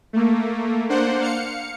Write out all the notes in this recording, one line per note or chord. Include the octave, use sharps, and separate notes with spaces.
A3 A#3
A#3 D4 C5 F#5
F5 C#7